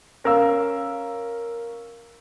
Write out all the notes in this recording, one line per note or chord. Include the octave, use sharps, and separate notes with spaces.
C#4 A#4 F5 E6